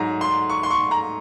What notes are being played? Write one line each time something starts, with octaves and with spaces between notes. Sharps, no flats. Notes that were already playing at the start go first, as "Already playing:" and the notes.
Already playing: G#2 F#3 A#5
C6
C#6
C6
C#6
A#5